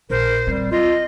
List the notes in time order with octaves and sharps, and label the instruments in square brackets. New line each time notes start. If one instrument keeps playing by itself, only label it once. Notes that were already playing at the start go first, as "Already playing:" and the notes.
[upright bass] A#1 [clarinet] A#4 [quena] C5
[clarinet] G3 [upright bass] C4
[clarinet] F4 [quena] D#5